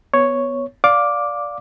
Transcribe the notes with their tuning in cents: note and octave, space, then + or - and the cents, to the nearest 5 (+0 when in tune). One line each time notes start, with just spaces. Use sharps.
B3 +0 C#5 +0
D5 -10 F5 +15 D6 +0